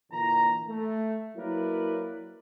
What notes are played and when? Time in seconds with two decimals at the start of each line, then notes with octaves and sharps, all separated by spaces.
0.12 A#2 D3 E3 A#5
0.68 A3
1.37 F#3 A#3 E4 A#4 B4 D5